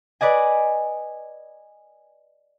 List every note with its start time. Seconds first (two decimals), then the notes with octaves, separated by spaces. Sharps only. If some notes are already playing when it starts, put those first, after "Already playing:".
0.21 B4 D5 D#5 G#5